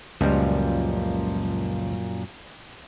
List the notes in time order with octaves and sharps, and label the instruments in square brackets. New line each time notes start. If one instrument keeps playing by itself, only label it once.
[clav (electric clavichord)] C#2 G3 [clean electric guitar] F#2 A#2 F3